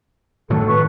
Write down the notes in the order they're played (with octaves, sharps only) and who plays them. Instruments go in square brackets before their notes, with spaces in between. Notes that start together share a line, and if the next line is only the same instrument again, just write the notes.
[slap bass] A2 D#3 F#3 [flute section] A4
[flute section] B4 C#6